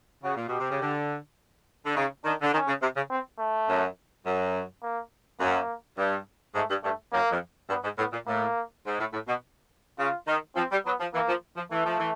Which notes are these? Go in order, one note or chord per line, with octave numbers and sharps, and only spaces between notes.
C#3 F#4
A#2
B2 G4
C3
C#3
D3
D3
C#3 D#4
D#3 D4
D3
D#3 C#4
C#3
C3
C#3
C4
A3
F#2
F#2
A#3
F#2 A#3
G2
G#2 A3
G2
G2 A3
F#2 A#3
F2
G2 B3
G#2
A2 B3
A#2
A2 A#3
G#2
A2
A2
B2
C#3 F4
D#3
F3 C4
G3
F#3 B3
F3
E3 A#3
F3
F3
E3 A3
F3
E3